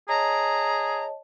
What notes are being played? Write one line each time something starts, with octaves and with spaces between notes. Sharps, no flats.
G#4 C#5 D#5 A5 A#5